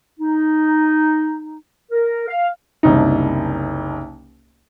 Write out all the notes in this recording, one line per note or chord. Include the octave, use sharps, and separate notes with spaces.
D#4
A#4
F5
F#1 C2 D#4